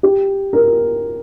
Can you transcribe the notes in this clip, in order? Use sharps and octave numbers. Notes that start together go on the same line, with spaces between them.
G4
A#4